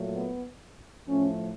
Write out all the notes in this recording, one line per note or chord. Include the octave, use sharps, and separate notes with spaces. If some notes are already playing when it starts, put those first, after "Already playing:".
Already playing: A#2 F#3 A3
B3
A2 F3 A3 C#4